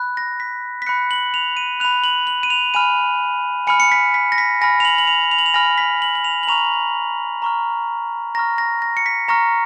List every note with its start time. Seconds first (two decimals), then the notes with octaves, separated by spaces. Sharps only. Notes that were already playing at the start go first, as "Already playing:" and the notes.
Already playing: B5 F#6
0.17 A#6
0.40 B6
0.82 B6
0.87 B5 F#6 C#7
1.11 F#7
1.34 F7
1.57 D#7
1.80 B5 F#6 F7
2.04 F#7
2.27 F#7
2.43 D#7
2.50 F7
2.74 G#5 B5 F6 D#7
3.67 G#5 B5 F6 C#7
3.80 C#7
3.92 B6
4.14 B6
4.32 A#6
4.38 B6
4.61 G#5 B5 F6 A#6
4.80 F7
4.85 F#7
4.98 F#7
5.07 F7
5.31 F7
5.39 F#7
5.46 F7
5.54 G#5 B5 F6 A#6
5.78 B6
6.02 F#7
6.15 F#7
6.24 F7
6.43 F#7
6.48 A#5 C#6 F6 F7
7.42 A#5 C#6 F6
8.35 A#5 C#6 F6 A#6
8.58 A#6
8.82 A#6
8.97 C#7
9.06 B6
9.28 A#5 C#6 F6 A#6